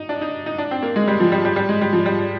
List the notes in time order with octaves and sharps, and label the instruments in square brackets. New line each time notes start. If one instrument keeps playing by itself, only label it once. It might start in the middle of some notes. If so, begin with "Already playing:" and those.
Already playing: [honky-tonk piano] D#4
D4
D#4
D#4
D4
C4
A#3
G#3
G3
F3
G3
G3
G3
G#3
G3
F3
G3